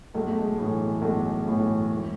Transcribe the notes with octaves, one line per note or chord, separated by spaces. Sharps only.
B1 G#3
A3
G#3
A2 E3
B1 G#3
A2 E3
E1